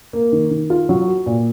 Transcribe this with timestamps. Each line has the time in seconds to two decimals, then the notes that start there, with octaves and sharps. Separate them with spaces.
0.13 A#3
0.32 D#3
0.51 D#3
0.70 F4
0.89 F#3
1.08 F#4
1.26 A#2